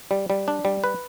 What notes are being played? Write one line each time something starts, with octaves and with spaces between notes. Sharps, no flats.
G3
G3
D4
G3
B4